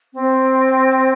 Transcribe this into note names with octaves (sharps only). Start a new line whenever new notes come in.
C4